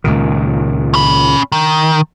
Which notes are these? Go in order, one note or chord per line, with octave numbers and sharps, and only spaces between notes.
C#2 A#2 D#3
C#4 B5
D#3